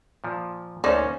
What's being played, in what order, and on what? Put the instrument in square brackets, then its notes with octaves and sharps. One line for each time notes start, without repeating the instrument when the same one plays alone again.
[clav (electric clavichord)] A#2 F3
[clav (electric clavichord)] D2 A#3 D#4 [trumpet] C#4 [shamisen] C5 D5